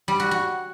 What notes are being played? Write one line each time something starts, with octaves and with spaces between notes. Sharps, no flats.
G3
F#4
F#4